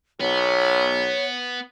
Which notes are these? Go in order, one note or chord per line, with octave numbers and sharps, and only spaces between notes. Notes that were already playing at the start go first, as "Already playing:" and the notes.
B1 B3 C#5